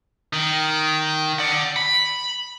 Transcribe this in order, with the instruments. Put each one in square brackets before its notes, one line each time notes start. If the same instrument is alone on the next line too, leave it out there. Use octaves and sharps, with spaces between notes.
[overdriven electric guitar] D#3
D5 F#5
B5